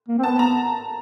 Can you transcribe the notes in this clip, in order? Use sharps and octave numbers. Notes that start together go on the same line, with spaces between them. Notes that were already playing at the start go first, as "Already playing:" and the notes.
A#3
C4
B3 A5
A#5